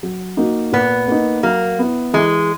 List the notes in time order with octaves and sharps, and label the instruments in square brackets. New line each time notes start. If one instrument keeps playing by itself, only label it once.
[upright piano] F#3
A#3 D#4 F#4
[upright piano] A#2 [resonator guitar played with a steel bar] B3
[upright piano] A#3 D#4
[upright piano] F#3 [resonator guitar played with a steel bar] A#3
[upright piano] B3 E4
[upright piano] E3 [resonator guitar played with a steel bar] G#3